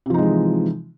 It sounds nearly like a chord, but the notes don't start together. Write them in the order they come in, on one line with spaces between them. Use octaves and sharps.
C3 F3 D#4 G#3 E3